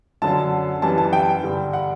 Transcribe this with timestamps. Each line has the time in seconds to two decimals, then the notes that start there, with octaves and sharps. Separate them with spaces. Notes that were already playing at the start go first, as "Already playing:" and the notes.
0.22 F#2 D3 F#3 A5
0.82 F#2 E3 G3 A5
0.98 A5
1.13 G5
1.43 G2 D3 G3
1.73 F#5